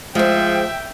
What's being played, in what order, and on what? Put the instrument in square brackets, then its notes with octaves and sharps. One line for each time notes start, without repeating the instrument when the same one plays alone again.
[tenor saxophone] F3 [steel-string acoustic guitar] G#3 C5 [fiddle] E5 [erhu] G5